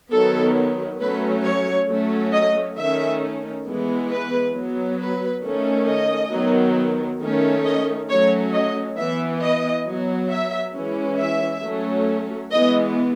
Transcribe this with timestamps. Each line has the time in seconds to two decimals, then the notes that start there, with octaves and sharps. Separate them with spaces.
0.12 D#3 F#3 B3 A4
1.00 F#3 A3 C#4 B4
1.45 C#5
1.89 F#3 A3 C#4
2.33 D#5
2.78 D#3 A3 C#4 E5
3.66 E3 G#3 B3
4.11 B4
4.54 F#3 B3
5.00 B4
5.44 D#3 A3 C#4
5.88 D#5
6.31 D#3 F#3 B3
7.21 D#3 A3 C#4
7.65 D#5
8.09 F#3 A3 C#4 C#5
8.54 D#5
8.97 E3 B3 E5
9.42 D#5
9.86 F#3 B3
10.30 E5
10.75 E3 G#3 C#4
11.19 E5
11.64 F#3 A3 C#4
12.51 E3 G#3 B3 D#5